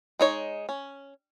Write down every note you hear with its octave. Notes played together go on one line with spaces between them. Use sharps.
G#3 D#4 C#5
C#4